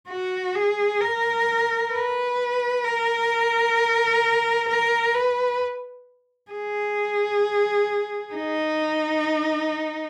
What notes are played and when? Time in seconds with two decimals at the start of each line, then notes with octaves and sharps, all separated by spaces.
0.09 F#4
0.55 G#4
1.01 A#4
1.93 B4
2.85 A#4
4.68 A#4
5.14 B4
6.52 G#4
8.35 D#4